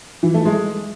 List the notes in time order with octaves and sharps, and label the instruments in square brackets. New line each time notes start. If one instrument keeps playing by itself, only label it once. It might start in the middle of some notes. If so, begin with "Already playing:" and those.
[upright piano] E3
A3
G#3